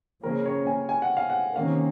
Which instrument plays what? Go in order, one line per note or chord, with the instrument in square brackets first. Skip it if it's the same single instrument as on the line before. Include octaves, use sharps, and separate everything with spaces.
[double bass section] C#3 F3 A#3 C#4 [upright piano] A#4
[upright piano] C#5
G#5
G#5
F#5
F5
F#5
[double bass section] C3 D#3 A#3 C#4 [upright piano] F5